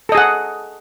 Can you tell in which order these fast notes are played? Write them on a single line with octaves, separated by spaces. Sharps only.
A4 D#5 G#4 F#5